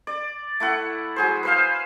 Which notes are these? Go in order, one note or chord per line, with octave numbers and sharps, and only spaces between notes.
D5
A3 E4 F#5
F#3 G#4 C5
B4 C5 F5